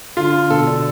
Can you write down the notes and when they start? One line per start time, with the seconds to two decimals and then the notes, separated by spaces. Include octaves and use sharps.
0.17 D3 F4
0.34 D3
0.50 B2 A4
0.67 D4